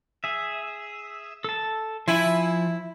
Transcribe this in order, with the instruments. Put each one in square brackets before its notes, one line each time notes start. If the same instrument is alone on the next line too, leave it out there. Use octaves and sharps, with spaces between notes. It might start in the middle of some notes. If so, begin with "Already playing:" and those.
[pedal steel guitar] G#4 E5
A4 A5
[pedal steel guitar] F3 G#5 [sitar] E4